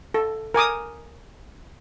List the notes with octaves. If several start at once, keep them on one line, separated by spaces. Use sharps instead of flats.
A4
A#4 G#5 D6 D#6